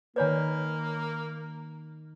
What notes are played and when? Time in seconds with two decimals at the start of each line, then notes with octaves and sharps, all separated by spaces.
0.16 D#3 A#3 B4 C#5 G#5 B5 G#6